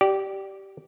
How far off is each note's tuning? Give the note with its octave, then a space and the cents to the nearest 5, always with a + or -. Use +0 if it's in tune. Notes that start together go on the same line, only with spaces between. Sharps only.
G4 -15 D5 +0